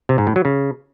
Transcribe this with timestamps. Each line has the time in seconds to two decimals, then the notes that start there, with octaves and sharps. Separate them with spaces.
0.09 C3
0.18 G#2
0.27 A2
0.36 F#3
0.45 C#3